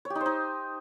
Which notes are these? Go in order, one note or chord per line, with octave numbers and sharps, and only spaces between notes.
C#5
G4
D#4
C5
D#4